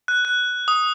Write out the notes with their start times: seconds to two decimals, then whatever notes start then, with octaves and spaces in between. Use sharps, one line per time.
0.08 F#6
0.25 F#6
0.68 D#6